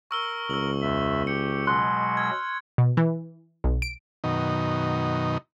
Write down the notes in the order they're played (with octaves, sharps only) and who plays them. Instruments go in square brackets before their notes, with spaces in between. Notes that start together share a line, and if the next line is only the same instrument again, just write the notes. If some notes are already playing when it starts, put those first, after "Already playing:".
[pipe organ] A#4 [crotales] C#6 E6 G7
[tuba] C#2 [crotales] E6 F#7
[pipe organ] E2 E5
[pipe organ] G4 [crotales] C#7
[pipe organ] B2 F#3 G#3 [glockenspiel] C6 F#6
[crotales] E6 F6 G#6
[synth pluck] B2
E3
B1
D7
[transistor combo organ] F#2 B2 D#3 D#4